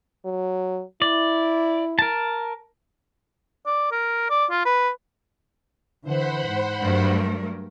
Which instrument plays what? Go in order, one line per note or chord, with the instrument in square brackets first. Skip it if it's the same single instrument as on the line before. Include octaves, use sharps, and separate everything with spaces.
[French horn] F#3
[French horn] E4 [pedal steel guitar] D5
[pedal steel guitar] A#4 A5
[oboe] D5
A#4
D5
F4
B4
[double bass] D3 E3 [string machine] C5 F#5 B5
[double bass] G#2
[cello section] G2 A3 A#4 [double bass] F#3